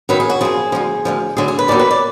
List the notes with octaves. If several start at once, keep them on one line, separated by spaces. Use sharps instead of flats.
F2 D#3 F#3 B4
G#4
F#4
F#2 F3 G#4
D2 D3 F3
D2 D3 F3
D2 D3 F#3 G#4
G#4
B4
D#2 D#3 F#3 D5
B4
D5